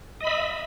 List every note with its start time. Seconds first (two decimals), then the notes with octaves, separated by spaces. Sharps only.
0.21 D#5
0.24 B5
0.27 E5